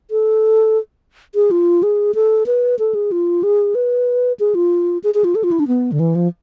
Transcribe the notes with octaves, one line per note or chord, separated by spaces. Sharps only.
A4
G#4
F4
G#4
A4
B4
A4
G#4
F4
G#4
B4
G#4
F4
G#4
G#4
F4
A4
F4
E4
D4
B3
D3
E3
F3